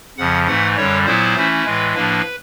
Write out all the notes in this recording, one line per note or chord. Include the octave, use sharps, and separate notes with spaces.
F2 C#3 F3 F#5
G#2 E3 A3 F#5
F#2 D3 G3 C#5
A#2 F#3 B3 E4 C5
E3 A3 C#4 E4
A2 E3 G#3 B4
A2 F3 A#3 D4 B4